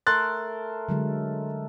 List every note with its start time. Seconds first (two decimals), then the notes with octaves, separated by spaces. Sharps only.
0.07 A3 A4 A#4 C6 F#6 A6
0.88 D3 F#3 G#3